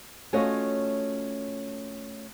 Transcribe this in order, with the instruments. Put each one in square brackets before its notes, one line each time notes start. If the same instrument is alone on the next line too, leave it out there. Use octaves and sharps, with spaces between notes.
[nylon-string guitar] A3 C#4 F4 F#4 C#5 D#5